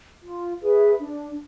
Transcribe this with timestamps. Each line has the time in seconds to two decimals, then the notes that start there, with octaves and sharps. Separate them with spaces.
0.23 F4
0.62 G#4 B4 E5
0.99 D4